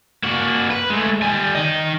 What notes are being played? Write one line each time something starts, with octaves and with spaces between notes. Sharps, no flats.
A#3 F#4
B4
G#3 A3
G3 G#5
D#3 D#5